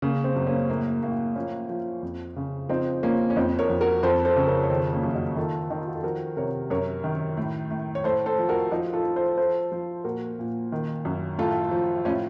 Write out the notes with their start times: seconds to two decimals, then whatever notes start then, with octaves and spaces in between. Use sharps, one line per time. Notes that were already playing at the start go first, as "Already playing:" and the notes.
0.02 C#3 A#3
0.24 C4
0.36 F#2
0.47 A#3 C#4
0.70 A2 A#3
1.03 A2 A#3
1.36 F3 A#3 C#4
1.69 F3
2.03 F2
2.36 C#3
2.69 F3 C4 D#4
3.03 F3 A#3 C#4
3.30 C#4
3.36 F2 C4 D#4
3.59 A#4 C#5
3.70 F2
3.81 F#4 A#4
4.03 F2 A4 C5
4.25 A4 C5
4.36 C#3
4.47 A#4 C#5
4.63 C#5
4.70 D#3 A4 C5
4.93 A#3 C#4
5.03 F#2
5.15 D#4 F#4
5.36 D#3 F4 A4
5.70 D#3 D#4
5.79 F4
5.87 F#4
5.95 A4
6.04 F3 F#4 A#4
6.37 C3 A#4 C#5
6.70 F#2 A#4 C#5
7.04 D#3
7.37 A2
7.71 A2
7.95 C#5
8.04 A2 A4 C5
8.26 A4 C5
8.38 F3
8.49 F#4 A#4
8.71 F3 D#4 F#4
8.93 F4 A4
9.04 F3
9.16 A4 C5
9.37 F3 A4 C5
9.72 F3
10.04 A#2 F#4 A#4
10.39 A#2
10.72 D#3
11.05 F#2
11.38 A2 F4 A4
11.71 F3
12.05 A2 C#4 F4